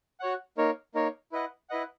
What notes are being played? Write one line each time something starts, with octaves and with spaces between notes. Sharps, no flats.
F#4 C#5 F#5
A#3 D#4 A#4 C#5
A#3 D#4 A#4 C#5
E4 B4 D#5 F#5
E4 B4 D#5 F#5